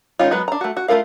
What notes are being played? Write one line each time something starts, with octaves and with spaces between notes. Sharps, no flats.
D#3 G#3 C#4 D#4 F4
F#3 G#3 B3 B4
D4 A#5
A3 F#4
F#4
A3 C#4 F4 A#4 F5